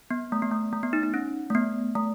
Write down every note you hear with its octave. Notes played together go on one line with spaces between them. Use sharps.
B3
A3
B3
A3
A3
B3
D#4
D#4
C#4
A3
B3
A3